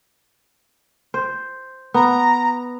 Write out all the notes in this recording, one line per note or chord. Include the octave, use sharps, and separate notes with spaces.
C5
B3 A#5